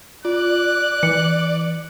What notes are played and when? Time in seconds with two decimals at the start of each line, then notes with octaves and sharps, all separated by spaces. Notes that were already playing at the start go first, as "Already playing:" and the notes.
0.25 F4 D5 F#6
1.03 E3 C#7